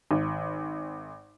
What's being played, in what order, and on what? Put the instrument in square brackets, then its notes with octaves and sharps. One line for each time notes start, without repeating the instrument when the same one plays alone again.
[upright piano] G#1